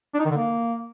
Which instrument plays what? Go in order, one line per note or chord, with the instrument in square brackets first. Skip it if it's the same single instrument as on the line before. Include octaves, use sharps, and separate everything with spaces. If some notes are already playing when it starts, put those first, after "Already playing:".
[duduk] D4
D#4
D#3
D3
A#3